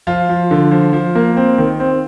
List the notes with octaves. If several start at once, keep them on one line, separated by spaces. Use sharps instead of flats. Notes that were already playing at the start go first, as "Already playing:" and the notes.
F3 F4
F3
D3
F3
F3
A#3
C4
D#3
C4